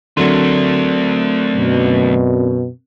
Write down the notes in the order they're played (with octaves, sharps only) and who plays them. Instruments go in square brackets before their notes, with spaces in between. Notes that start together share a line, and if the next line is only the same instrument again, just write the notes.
[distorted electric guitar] D2 A3 [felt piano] D3 F#3 [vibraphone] C4 A#4 D5
[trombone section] F#2 B2